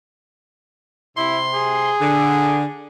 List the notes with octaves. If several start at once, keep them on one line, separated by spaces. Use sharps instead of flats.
C3 E4 C6
G#4
D3